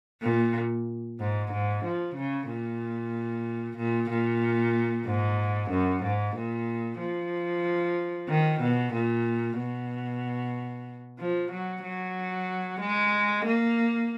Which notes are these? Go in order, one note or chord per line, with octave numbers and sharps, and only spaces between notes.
A#2
G#2
G#2
F3
C#3
A#2
A#2
A#2
G#2
F#2
G#2
A#2
F3
D#3
B2
A#2
B2
F3
F#3
F#3
G#3
A#3